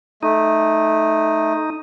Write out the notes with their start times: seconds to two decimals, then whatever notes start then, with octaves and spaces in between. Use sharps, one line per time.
0.23 A3 D#4